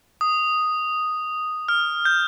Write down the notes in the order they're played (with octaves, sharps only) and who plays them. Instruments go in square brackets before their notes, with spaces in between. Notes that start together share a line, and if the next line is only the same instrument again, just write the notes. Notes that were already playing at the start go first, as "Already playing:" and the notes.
[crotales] D#6
F6
G6